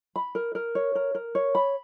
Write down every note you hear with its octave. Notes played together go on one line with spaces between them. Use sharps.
B5
A#4
A#4
C#5
A#4
A#4
C#5
B5